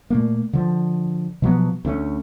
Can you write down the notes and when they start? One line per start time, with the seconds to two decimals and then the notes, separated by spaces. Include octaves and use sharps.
0.10 A#2 A3 A#3
0.53 D3 F3
1.42 B2 F3 F#3 B3
1.85 D2 A3 B3 C#4